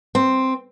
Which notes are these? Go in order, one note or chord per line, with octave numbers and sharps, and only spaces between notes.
C4